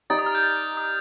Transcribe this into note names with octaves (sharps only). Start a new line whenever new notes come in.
D#4 G4 D5 A6
D#6
F6
G6
A6
D#6